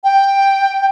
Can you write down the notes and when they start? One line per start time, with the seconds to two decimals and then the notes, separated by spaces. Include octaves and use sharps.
0.04 G5